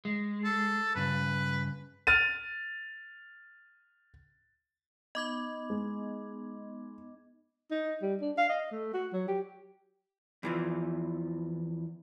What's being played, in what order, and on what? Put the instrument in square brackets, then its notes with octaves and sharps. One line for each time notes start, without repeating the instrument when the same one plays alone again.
[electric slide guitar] G#3
[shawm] A4
[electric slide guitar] G2 C#3 [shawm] B4
[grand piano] F6 A6 D#7
[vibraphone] B3 D#4 [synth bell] D#5 D6 G#6
[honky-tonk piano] G#3
[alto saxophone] D#4
G3
D4
F5
D#5
A3
F#4
F#3
G4
[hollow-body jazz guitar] E2 E3 F3